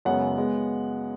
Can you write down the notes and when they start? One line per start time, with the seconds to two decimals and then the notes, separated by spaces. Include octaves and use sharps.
0.05 F#2 C#3 G#3 B3 F#5
0.37 G#3 B3